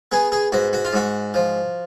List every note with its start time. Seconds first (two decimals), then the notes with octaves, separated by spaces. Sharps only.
0.12 B3 G#4
0.32 G#4
0.52 G#2 F#4
0.73 F#4
0.85 F4
0.93 G#2 F#4
1.34 F3